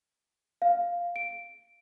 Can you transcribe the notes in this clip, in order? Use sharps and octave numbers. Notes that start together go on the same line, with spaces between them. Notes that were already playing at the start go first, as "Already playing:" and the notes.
F5
D7